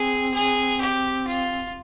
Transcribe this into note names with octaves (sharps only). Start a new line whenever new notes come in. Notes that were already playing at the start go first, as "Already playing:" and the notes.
Already playing: C4 G#4
G#4
G4
F4